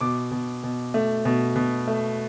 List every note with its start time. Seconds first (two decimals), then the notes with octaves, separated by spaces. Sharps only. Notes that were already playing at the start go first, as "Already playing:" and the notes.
0.01 B2 D6
0.31 B2
0.64 B2
0.94 A3
1.25 B2
1.56 B2
1.87 A3